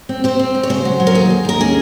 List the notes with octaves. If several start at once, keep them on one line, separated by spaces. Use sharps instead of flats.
C4
C4 C5
C4
G#3
C#5
C#3 C5
F#3
F#3
A#4
D#2 G#4
D#2
D#2 A#4
C#4 G#4